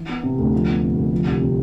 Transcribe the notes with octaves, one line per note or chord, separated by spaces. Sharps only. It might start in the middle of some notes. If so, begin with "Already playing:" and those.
Already playing: E3
B3
C3
D2
F3
B3
C3
D2
F3
C2
C3